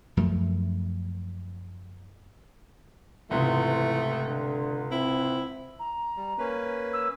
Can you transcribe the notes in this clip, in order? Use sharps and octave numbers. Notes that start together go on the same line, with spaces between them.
F#2 F3 A3
C#2 G#2 C3 E3 A3
D3
C4 E4
A#5
G3
A#3 C#4 B4
E6